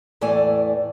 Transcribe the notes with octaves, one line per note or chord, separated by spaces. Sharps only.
E2 A2 E3 A3 D5 G#5